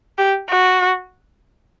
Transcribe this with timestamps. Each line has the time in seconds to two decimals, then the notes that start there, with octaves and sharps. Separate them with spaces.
0.18 G4
0.49 F#4